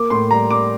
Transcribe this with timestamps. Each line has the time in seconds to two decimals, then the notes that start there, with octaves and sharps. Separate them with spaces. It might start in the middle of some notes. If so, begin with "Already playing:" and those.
Already playing: A#3 D6
0.10 A2 C6
0.31 G3 A#5
0.51 G3 D6